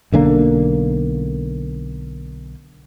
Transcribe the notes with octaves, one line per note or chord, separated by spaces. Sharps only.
B1 D3 D#3 A#3